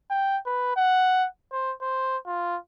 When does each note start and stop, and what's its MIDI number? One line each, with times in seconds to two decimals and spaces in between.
0.10 0.38 79
0.46 0.72 71
0.76 1.27 78
1.52 1.73 72
1.81 2.18 72
2.27 2.57 65